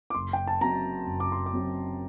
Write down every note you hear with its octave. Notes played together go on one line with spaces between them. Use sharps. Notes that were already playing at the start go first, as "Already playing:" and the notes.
D6
F#1 C6
G5
A5
F#2 F#3 C4 A#5
F#1
D6
C6
D6
F#2 F#3 C4